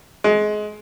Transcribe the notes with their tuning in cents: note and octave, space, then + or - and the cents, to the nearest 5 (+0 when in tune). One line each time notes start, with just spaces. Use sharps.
G#3 +20